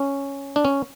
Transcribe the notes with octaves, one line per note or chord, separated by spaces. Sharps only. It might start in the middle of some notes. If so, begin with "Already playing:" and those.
Already playing: C#4
D4
C#4